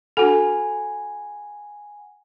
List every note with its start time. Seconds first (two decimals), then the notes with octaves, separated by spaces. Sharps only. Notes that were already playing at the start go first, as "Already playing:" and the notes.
0.17 D4 F#4 A4 F#5 G#5 B5